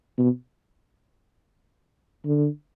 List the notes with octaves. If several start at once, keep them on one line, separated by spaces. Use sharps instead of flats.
B2
D3